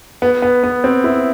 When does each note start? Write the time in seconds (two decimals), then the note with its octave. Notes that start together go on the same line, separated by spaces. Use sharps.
0.22 B3
0.42 B3
0.64 B3
0.84 C4
1.04 E4